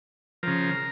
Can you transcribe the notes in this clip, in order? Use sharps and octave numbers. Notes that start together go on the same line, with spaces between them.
C#3 F3 A#4